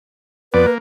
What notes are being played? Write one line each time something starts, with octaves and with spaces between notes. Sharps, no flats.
F2 B3 B4 D5
A#3